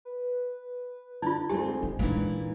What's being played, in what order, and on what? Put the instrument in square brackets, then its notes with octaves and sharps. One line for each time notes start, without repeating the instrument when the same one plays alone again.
[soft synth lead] B4
[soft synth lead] D3 [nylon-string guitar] D4 [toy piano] D#4 F4
[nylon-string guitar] D2 G#3 C4 [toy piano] G4 [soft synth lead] G#5
[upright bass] D#3 [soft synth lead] D#4
[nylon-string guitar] A#2 E3 [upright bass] G#3 D4